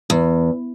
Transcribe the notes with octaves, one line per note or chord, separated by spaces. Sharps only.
E2